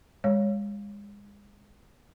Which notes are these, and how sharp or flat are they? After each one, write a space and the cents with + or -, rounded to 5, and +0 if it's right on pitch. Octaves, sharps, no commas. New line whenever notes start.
G#3 -30 C#5 +0